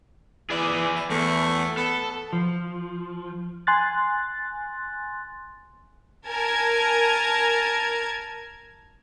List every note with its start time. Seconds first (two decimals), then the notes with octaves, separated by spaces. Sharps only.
0.50 E3 G#4 D5
0.95 E4
1.10 E2 A3
1.77 B3 A4
2.33 F3
3.67 G#5 C6 F#6 A6
6.28 A#4 G#5 A5 G#6